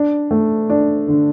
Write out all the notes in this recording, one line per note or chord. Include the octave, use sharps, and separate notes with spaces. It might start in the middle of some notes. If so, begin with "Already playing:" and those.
Already playing: D4
A3
D4
D3